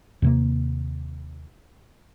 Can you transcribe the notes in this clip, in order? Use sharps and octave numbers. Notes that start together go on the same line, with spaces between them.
D#2 C3 A#3